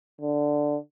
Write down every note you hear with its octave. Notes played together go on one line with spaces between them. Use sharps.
D3